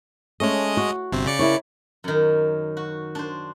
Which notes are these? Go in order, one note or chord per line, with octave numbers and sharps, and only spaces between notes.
G#3 A3 C#4 D#5
F#4
G1 C3 C4
C#3 D5 C#7
E4 A#4 C#5
F#2 D#3
F#4
D4 C5